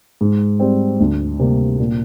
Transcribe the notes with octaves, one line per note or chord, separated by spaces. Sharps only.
G#2
G3 C4
D2
C3 G3 A#3
A#2